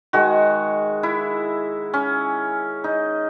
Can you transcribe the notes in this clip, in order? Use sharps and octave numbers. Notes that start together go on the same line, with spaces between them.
D#3 G#3 F#4
E4
C#4
D#4